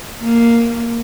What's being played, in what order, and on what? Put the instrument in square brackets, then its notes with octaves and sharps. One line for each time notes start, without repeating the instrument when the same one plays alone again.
[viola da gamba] A#3